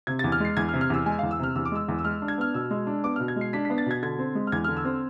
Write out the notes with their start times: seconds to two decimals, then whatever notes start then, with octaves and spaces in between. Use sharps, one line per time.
0.07 C3 G#6
0.19 E2 A6
0.32 F6
0.40 G#3 C7
0.57 E2 G#6
0.69 F6
0.73 C3
0.81 F6
0.90 E2 E6
1.06 G#3 G#5
1.19 E2 F5
1.31 E6
1.39 C3 F6
1.55 E2 E6
1.65 D6
1.72 G#3 E6
1.88 E2
1.99 E6
2.05 G#3 F6
2.22 D4
2.28 G#6
2.38 B3 F6
2.54 B2 E6
2.71 G#3
2.87 D4
3.04 B3 D6
3.16 B2 F6
3.28 G#6
3.36 G#3 C7
3.53 D4 B6
3.65 B3 B6
3.78 A6
3.86 B2 G#6
4.03 D3 G#6
4.19 C4
4.35 G#3
4.47 F6
4.52 E2 G#6
4.64 D3 F6
4.77 E6
4.85 C4